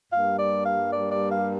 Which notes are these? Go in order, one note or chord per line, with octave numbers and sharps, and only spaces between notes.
G2 G3 A#3 F5
D5
F5
D5
D5
F5